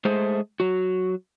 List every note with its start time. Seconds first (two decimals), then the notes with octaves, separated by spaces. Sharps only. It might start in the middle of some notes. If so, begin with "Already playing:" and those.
0.05 G#3 A3 G#4 C5
0.60 F#3 F#4